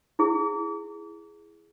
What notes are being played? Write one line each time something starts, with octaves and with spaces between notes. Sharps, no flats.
E4 G#4